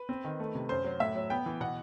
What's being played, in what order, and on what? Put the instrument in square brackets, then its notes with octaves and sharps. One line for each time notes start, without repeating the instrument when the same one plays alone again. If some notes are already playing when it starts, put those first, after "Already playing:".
Already playing: [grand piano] B4
C4
D#3
A3
C3
F#2 C5
F#3
A2 E5
F#3
B3 G5
E3
B2 F#5